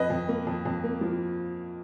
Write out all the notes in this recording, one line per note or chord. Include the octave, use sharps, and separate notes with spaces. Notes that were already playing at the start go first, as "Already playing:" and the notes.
Already playing: F2 B4 D#5
F2
A#3
F2
F2
A#3
F3